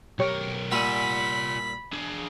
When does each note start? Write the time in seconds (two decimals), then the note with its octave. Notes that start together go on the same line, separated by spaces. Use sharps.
0.19 B1 G4 A#4 C#5
0.72 A#2 G3 F4 E5 F#5 G#5 B5
1.93 D4 G#4